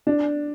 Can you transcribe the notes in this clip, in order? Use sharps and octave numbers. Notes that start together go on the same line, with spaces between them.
D4